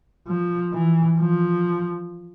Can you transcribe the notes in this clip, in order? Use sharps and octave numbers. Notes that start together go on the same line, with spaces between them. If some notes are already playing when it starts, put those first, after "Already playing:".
F3
E3
F3